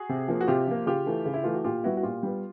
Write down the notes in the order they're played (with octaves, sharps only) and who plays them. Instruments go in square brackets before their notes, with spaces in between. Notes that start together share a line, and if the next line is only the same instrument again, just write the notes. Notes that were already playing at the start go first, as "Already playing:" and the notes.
Already playing: [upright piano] F#4 G#4
C3
F3 A#3
F#4
C3 F4 G4
F3 A#3
C#3 F4 G4
E3 A3
C#3
E4
E3 A3 F4
F#4
A#2 F4 G4
G3 B3 E4 F#4
F#4
A#2 F4 G4
G3 B3